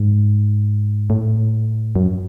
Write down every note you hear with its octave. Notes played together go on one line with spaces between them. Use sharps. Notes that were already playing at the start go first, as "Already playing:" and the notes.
Already playing: G#2
A2
F#2